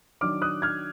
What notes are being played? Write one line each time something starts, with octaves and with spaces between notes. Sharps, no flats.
D#3 F#3 D4 D6 F6
D#6 F#6
F6 G#6